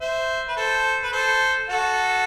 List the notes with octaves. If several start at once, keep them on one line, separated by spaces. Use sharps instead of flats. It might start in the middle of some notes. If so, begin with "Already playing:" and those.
C5 E5
B4
A4 C5
B4
A4 C5
F#4 A4